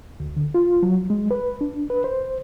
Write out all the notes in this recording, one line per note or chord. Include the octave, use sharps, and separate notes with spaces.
D2
D3
F4
F#3
G#3
B4
D4
B4
C5